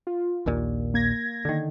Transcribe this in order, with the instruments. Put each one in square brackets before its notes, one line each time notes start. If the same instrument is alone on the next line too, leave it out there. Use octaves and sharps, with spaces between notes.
[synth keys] F4
[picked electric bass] A#1 D#2 A#2
[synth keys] A#3 G#6 A#6
[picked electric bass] D3 D#3